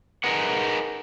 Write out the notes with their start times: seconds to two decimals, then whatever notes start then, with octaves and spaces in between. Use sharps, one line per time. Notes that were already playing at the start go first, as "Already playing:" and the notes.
0.24 D#4 G#4 A#4 B4 F#5